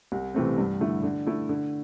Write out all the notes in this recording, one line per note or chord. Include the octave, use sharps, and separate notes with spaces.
C2
C3 E3 A3 C4
G2
D3 A3 E4
D3
A3 E4
D3